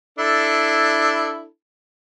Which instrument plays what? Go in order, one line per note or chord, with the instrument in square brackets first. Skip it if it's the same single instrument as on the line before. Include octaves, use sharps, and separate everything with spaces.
[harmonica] D4 E4 A4